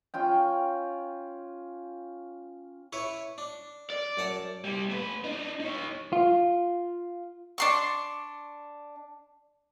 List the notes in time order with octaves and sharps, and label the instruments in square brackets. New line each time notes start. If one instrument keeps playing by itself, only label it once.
[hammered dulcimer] C#4 F4 G5
[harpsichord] E4 B4 C#5
D4
[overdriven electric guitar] D5
[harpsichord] F#2 F#5 A5
[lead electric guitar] C3 G3
A3 B4
D4 D#4
D#4 C#5
[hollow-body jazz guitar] F4
[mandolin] D4 C6 C#6